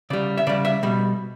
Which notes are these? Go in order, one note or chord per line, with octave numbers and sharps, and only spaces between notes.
C#3 G3 D5
E5
C#3 G3 D5
E5
B2 G3